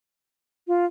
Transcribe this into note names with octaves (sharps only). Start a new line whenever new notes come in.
F4